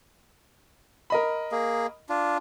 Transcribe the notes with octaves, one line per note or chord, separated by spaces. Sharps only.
A#4 D#5 B5
A#3 G#4
D4 F4